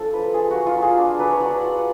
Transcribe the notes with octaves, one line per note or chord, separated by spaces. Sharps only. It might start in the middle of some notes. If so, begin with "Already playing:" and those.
Already playing: F3 D4 A4
F4 B4
F4 G#4
F#4
F#3
F4
F#3 G#4
D4
F#3 B4
C#5
F#3 D5
F4 F#5